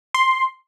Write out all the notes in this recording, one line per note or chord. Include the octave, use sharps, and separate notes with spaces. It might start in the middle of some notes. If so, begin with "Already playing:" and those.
C6